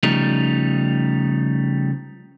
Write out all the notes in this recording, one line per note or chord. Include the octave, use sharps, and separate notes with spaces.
C#3 F3 G3 A3 D#4